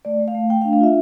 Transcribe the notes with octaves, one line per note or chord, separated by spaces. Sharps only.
A3 D5
A3
F5
A3
A3 G5
F5
D4
F5
F4 E5